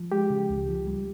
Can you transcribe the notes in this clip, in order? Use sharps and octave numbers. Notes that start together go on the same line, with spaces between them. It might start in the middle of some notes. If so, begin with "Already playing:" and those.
Already playing: F3
G#3 G4
C#3
C#2
F3
G3